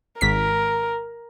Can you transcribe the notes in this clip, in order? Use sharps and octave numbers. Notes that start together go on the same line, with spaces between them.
G#1 A#4 B6